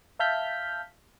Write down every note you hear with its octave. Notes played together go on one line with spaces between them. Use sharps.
E5 F5 A5 F6 G6 B6